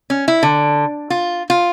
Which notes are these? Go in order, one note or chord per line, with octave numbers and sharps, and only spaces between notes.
C#4
E4
D3
F4
F4